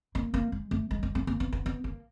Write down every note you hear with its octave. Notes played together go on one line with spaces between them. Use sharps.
A#3
A#3
G#3
A3
G#3
G#3
A3
A#3
B3
B3
B3
A#3